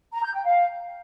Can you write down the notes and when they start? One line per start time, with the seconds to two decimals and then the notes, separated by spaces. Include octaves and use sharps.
0.12 A#5
0.23 G6
0.34 G5
0.44 F5